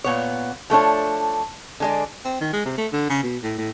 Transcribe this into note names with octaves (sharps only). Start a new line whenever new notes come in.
A#2 B3 C#5
F3 A3 D4 C#5
D3 G#3 D5
C4
D#3
G#3
C3
A3
D3
C#3
B2
A2
A2